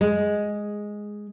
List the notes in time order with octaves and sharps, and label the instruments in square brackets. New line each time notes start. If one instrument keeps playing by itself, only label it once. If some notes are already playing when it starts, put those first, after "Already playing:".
[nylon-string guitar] G#3